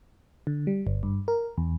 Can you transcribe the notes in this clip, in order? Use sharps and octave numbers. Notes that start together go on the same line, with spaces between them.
D3
G3
G1
G2
A#4
E2